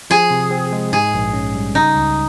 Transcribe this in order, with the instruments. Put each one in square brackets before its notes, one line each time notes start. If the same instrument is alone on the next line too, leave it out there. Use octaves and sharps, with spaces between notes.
[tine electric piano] F3 [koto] G#4
[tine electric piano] C3
C4
G#3
[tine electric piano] G#2 [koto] G#4
[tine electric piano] A#1
C#4
G3
[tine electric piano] C#3 [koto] D#4
[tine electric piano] C#2